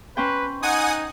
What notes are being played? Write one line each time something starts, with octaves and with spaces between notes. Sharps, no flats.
C#4 B4 C5 G5
D#4 F#5 G#5 D#6